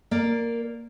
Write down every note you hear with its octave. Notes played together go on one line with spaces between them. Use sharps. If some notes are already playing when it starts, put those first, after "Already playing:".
A#3 A#4 D5